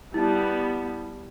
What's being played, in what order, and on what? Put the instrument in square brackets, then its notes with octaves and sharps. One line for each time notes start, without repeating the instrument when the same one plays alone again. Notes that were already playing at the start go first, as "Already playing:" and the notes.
[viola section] G3 B3 [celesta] E4 A5